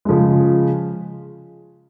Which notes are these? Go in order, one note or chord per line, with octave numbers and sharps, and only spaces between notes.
C#3 F3 G#3